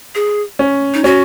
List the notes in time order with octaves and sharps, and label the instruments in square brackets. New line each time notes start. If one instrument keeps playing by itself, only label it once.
[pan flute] G#4
[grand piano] C#4
[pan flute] D#4
[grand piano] C#4 [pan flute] F#4